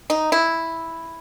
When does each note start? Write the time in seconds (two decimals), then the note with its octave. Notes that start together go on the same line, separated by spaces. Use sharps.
0.10 D#4
0.32 E4